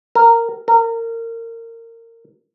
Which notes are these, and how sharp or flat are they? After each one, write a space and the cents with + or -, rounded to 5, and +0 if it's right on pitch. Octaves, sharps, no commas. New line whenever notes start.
A#4 -10
A#4 -25